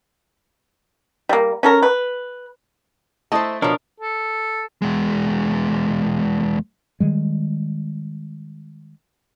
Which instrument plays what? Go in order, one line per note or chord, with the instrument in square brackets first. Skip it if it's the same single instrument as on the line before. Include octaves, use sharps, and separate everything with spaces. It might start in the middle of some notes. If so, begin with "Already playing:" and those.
[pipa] G3 A#3
C#4 A4 A#4
B4
[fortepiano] A3 E4 D#5 [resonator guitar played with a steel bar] C5 A5
[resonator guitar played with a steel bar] B2 F3 [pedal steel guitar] D4 A#4 [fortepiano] C#5
[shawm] A4
[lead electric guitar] E2 G#3
[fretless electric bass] D#3 G3 G#3